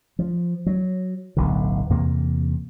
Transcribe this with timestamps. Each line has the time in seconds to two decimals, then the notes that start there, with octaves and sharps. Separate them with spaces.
0.19 F3
0.66 F#3
1.37 D1 B1 D3
1.90 E2 C3 A#3